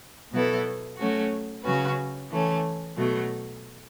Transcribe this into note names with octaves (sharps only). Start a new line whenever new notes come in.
B2 F#3 B3 E4 A4
F#3 A3 C#4 F#4
C#3 F#3 C#4 F#4 B4
E3 A3 C#4
B2 F#3 A3